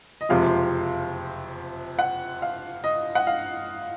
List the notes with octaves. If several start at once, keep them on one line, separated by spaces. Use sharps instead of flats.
D#5
F#1 F2 C3 F3 G#3 F5
F#5
F5
D#5
F#5
F5